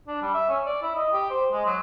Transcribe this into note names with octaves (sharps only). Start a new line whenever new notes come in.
D4
G3
E5
C#4
D5
E4
D#5
G4
C5
G#3
F#3